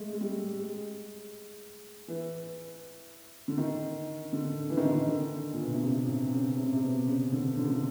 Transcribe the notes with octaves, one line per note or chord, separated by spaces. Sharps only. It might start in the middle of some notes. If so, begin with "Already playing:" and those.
Already playing: G#3 A3
G#3
G3
G#3
E3
D3
D#3
D3
E3
D#3
D3
D#3
D3
A#2
B2
C3
C#3
C3
C#3
C3
C#3
C3
B2
C#3
D3
D3
C#3
D3